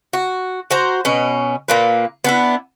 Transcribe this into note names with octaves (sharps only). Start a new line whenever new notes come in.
F#4
F#4 C5 A#5
B2 C#4
A#2 A#3 B4
B3 D4 E4